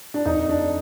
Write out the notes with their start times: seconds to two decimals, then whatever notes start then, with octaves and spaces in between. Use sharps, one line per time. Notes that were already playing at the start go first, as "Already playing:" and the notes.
0.14 D4
0.25 F2 D#4
0.49 D4